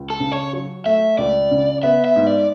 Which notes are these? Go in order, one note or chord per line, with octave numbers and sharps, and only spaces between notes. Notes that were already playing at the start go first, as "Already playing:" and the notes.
Already playing: C#2
A4
C#3
C#5
F#3
A3 E5
C#2 D5
C#3
B3 E5
E5
G#2
D5